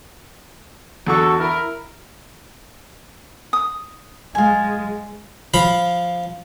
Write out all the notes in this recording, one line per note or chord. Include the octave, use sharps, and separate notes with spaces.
E2 D3 F#4 A4 C#6
E4 A#4
D#6
G#3 F4 G#5
F3 F5 B5